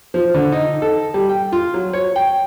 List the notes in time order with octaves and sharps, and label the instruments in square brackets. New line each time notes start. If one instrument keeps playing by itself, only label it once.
[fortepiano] F3
D3
D#4
A4
G3
G5
F4
F#3
C#5
G5